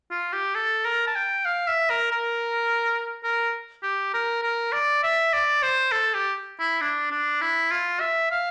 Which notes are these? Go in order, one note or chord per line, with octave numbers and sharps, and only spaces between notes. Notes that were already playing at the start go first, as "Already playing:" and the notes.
F4
G4
A4
A#4
A5
G5
F5
E5
A#4
A#4
A#4
G4
A#4
A#4
D5
E5
D5
C5
A4
G4
E4
D4
D4
E4
F4
E5
F5